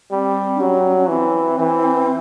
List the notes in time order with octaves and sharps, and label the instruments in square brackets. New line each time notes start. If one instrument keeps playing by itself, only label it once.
[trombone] G3 [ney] C4
[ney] D4
[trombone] F#3 [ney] C#4
[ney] C#4
C#4
C#4
[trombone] E3 [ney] C4
[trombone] E3